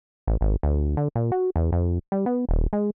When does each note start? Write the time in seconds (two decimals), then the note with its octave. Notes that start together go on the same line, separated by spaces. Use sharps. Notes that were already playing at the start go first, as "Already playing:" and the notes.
0.27 A1
0.41 G#1
0.63 D2
0.97 D3
1.16 A#2
1.32 F#4
1.56 E2
1.72 F2
2.12 G3
2.26 B3
2.49 D#1
2.73 G#3